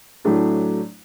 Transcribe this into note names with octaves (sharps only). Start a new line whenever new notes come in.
A2 F#3 A3 D4